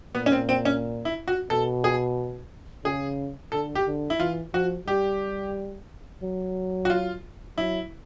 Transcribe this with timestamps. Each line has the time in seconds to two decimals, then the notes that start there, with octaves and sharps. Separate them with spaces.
0.14 A#2 B3
0.26 C#4
0.32 C4
0.49 C4
0.65 C#4
1.05 E4
1.28 F#4
1.50 B2 A4
1.84 G#4
2.84 C#3 G#4
3.52 D3 A4
3.75 G4
3.86 D3
4.10 E4
4.19 E3 F4
4.53 F3 F#4
4.87 G3 G4
6.23 F#3
6.85 F#4
6.90 F4
7.57 F#3 E4